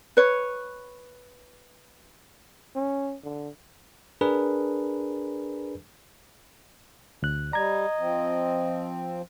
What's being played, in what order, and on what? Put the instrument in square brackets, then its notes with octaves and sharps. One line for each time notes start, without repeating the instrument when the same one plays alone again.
[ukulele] B4 C#5
[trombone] C#4
D3
[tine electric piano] D4 G#4 A#4 B4
[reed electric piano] D2 F#6
[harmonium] G3 [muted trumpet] D#5 [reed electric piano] A#5 G#6
[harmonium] F3 C4